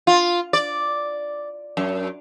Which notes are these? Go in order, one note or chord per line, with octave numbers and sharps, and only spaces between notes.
F4
D5
F#2